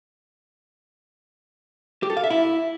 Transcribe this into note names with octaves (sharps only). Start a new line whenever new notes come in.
G4
A4
F5
E5
E4